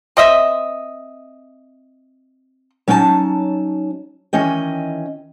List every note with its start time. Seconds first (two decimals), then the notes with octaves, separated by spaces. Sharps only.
0.17 C4 D#5 E5
2.88 F#3 C#4 D#4 E4 A5
4.33 D#3 E3 C#4 D#5 G5